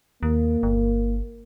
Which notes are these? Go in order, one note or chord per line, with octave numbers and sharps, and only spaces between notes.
D#2 A#3
G1